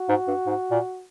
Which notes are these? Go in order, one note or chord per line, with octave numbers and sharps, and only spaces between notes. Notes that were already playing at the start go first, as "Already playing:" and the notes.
Already playing: F#4
G#2
G2
G#2
A#2